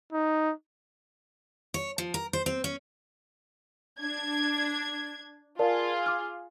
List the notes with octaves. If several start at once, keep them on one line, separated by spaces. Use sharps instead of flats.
D#4
C#5
F3
A#4
C5
C4
C#4
D4 G#6
F4 G#4 A#4 D5 A5
D6 F6